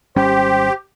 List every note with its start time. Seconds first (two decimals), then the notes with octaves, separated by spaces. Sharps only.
0.16 G#1 G3 C#4 G4 C5